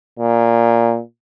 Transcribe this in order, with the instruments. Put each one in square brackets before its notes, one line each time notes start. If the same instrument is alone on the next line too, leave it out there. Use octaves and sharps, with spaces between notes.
[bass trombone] A#2